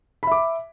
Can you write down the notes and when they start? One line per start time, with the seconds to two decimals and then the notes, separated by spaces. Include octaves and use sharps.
0.23 B5
0.27 E5
0.32 D6